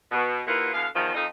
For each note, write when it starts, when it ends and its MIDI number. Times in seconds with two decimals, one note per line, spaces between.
0.11 0.41 47
0.47 0.69 39
0.47 0.69 58
0.47 0.69 64
0.47 0.69 65
0.47 0.69 71
0.47 0.69 78
0.73 0.86 47
0.73 0.86 50
0.73 0.86 52
0.73 0.86 77
0.94 1.13 40
0.94 1.13 51
0.94 1.13 53
1.14 1.25 41
1.14 1.25 63